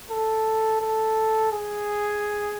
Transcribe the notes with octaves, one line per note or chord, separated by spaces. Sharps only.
A4
A4
G#4